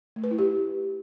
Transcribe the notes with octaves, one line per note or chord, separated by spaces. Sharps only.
A3
B4
E4
G4